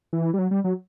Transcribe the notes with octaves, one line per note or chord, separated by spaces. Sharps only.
E3
G3
F#3
G3
F#3